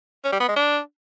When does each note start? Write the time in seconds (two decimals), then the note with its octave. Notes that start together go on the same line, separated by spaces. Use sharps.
0.24 C#4
0.32 G3
0.40 B3
0.48 G#3
0.56 D4